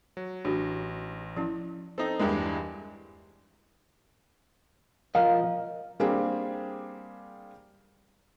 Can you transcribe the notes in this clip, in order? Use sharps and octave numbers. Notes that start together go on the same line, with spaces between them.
F#3
A1 D4 F#4 G4
F3 C#4 E4
C4 D#4 A4
E2 G2 G#3 D4 E4 G4 A#4
F3 A#4 D#5 F5
G3 A#3 C4 D4 G4 G#4